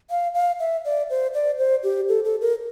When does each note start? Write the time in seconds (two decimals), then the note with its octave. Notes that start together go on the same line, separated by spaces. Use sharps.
0.11 F5
0.34 F5
0.60 E5
0.85 D5
1.10 C5
1.34 D5
1.58 C5
1.84 G4
2.09 A4
2.24 A4
2.41 A#4